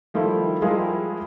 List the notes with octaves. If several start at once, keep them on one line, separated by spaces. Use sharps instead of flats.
D#3 F3 G3 A3 E4
F3 G3 G#3 E4 G#4 A#4